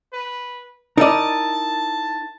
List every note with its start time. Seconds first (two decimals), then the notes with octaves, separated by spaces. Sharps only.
0.13 B4
0.98 D#4 E4 A#4 D5 D#5 A5